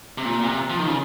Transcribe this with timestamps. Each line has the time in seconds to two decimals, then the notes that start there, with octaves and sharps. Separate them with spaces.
0.18 C3
0.25 A#2
0.43 C3
0.70 F3
0.79 D#3
0.88 C#3